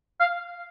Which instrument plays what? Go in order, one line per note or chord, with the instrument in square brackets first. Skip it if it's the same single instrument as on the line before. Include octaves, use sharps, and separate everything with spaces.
[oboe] F5